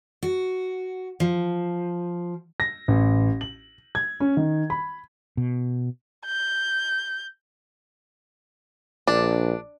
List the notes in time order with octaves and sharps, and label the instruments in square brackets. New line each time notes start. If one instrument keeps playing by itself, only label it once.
[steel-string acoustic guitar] F#4
F3
[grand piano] A#6
A1
F#7
G#6
C#4
D#3
B5
[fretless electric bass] B2
[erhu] G6
[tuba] A#1 [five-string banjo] D4